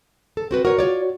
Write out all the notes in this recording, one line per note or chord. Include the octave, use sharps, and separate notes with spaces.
A4
C4 F#4 B4
F#4 A#4 C#5
F4 C#5 D5